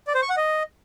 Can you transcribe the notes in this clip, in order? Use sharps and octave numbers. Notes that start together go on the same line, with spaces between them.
D5
C5
C#6
F#5
D#5